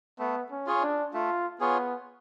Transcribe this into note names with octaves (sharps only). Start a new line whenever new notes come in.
A3 B3
C#4
F4 G#4 C#5
D4
A3 F4
B3 F4 G#4 C#5